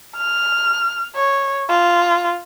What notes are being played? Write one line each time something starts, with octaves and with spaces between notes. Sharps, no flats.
F6
C#5
F4